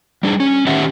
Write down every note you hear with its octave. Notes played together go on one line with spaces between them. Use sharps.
G3 D4 G#4
C#4
A2 D#3 C#4 G4 E5 F#5